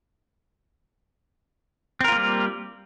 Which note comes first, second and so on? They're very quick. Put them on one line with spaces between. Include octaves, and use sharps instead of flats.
C4 A#4 F4 A#3 G3